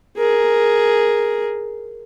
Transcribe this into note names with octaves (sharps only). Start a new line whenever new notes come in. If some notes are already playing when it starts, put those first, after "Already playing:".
G#4 A#4